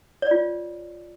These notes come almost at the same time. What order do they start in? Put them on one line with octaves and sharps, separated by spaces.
C#5 D5 F4